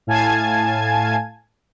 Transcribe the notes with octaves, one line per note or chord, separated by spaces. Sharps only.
A2 F5 G#5 A5 G#6